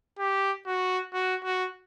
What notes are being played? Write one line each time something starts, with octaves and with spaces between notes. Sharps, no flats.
G4
F#4
F#4
F#4